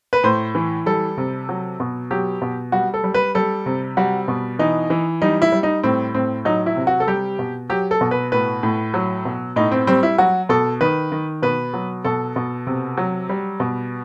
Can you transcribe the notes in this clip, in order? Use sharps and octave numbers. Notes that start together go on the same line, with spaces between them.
B4
A2 C5
E3
G3 A4
C3
F#3
B2
F#3 G4
B2
G3 F#4
A4
G3
B4
G3 A4
C3
G3 F#4
B2
E3 D#4
E3
G3 D#4
E4
G3
D#4
A2 C4
A2 C4
F#3 D#4
E4
C3
F#4
A4
G3 G4
B2
F#3 G4
A4
B2
B4
A2 B4
A2
F#3
B2
A2 D#4
C4
G3 C4
E4
F#3 F#4
B2 A4
D#3 B4
D#3
B2 B4
F#3
B2 A4
B2
C3
F#3
G3
B2